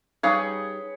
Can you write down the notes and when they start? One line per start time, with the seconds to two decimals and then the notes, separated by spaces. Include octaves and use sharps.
0.23 G3 D#4 G#4 B4 C#5 F5